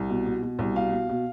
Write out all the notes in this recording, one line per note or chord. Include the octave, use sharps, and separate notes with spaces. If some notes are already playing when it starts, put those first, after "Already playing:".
Already playing: C2
B2
B2
B2
C2
B2 F5
B2
B2